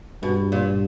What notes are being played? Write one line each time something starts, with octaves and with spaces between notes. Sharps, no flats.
G2 B2
A#2